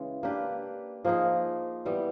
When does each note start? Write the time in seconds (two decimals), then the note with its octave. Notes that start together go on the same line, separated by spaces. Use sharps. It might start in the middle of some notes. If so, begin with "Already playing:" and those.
Already playing: C#3 E3 G#3
0.23 A#3 D4 G4 B4
1.05 F3 A#3 D#4 G#4
1.85 E3 G3 B3